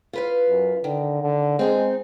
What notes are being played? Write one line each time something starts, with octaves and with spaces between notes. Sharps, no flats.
F4 B4 F5
F#2
D3 D#3
D3
G#3 C4 D#4 G#4